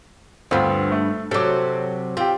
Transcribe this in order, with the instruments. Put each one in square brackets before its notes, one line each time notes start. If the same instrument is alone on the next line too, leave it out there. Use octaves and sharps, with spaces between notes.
[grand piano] D2 C4 F4 [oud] G2 B3
[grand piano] A3
[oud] C3 F#3 [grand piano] A4 D6
[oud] C4 [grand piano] F4 G4